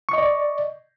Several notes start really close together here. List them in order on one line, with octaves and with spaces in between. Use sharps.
C#6 D#5 D5